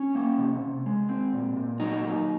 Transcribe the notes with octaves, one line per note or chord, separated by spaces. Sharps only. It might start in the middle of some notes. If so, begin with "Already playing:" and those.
Already playing: C#4
A#3
C3
C3
G#3
C4
A#2
A#2
F#3 D#4
A#3